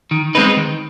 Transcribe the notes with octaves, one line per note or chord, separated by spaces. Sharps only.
D#3
G#3 C4 D#4 B4
D#3